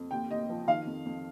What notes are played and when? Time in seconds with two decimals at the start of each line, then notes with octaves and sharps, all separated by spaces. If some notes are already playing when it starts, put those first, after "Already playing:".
Already playing: F2
0.11 D#2 G5
0.30 D#2 D#5
0.49 F3
0.67 D#3 F5
0.86 F2
1.06 F2